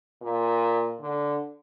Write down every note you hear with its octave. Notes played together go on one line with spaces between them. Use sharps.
A#2
D3